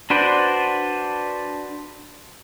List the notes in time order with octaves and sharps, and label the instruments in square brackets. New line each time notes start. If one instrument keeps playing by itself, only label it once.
[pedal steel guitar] D4 F#4 B4 C5 D5